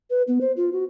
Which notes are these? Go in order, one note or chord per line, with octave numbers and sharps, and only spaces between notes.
B4
B3
C5
F4
F#4